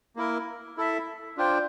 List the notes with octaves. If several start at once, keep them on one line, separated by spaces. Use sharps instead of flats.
A#3 E4 A#4
E4 A4 E5
D4 F4 C5 G5